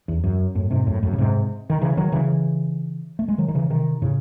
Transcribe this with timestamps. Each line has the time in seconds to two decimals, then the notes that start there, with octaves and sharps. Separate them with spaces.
0.08 E2
0.24 F#2
0.55 F#2 A2
0.71 G#2 C3
0.87 F#2 A2
1.03 F#2 A2
1.13 C#3
1.18 G#2 C3
1.70 D#3
1.82 C#3 E3
1.97 D#3 F#3
2.12 C#3 E3
3.19 A3
3.28 G#3
3.38 D#3 F#3
3.48 D#3
3.55 C#3 E3
3.70 C3 D#3
4.02 A2 C#3